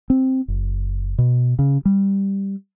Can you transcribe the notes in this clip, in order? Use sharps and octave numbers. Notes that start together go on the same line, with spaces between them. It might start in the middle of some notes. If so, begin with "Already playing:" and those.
C4
F#1
B2
C#3
G3